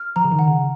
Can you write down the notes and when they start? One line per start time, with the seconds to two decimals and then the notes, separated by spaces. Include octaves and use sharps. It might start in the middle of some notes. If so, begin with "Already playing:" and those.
Already playing: F6
0.16 F3 A#5
0.24 C#3
0.31 D#3
0.39 F#5
0.47 C#3